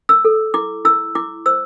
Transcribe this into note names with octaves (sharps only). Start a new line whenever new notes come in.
E6
A4
E4 D6
E4 E6
E4 D6
C5 E6